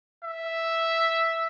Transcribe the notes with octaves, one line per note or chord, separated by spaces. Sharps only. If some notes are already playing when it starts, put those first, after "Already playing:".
E5